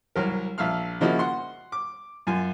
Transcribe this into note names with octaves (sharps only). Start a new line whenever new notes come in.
C2 F#3 A#4
A#1 E5 F5 F6
C#3 F3 A#3 D#4 E4 F#4
F#5 C6
D6
F#2 F4 G#5